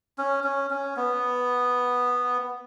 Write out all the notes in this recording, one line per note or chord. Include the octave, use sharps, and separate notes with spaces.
C#4
C#4
C#4
B3